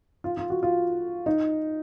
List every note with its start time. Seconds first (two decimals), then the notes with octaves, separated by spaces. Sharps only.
0.24 F4
0.37 F4
0.50 F#4
0.63 F4
1.26 D#4